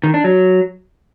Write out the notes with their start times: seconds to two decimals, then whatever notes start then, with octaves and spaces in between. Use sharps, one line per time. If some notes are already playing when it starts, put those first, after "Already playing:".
0.03 D#3
0.14 D4
0.24 F#3